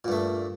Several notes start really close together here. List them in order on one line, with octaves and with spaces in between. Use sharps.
A#2 G2 A3